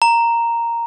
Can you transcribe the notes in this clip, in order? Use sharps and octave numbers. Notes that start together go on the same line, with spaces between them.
A#5